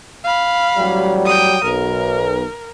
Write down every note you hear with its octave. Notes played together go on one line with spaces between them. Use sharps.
F5 B5
A1 F#3 G3
G5 D#6
B1 A#4